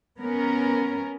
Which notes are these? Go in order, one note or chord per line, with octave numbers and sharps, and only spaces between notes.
B3 C#4 A#4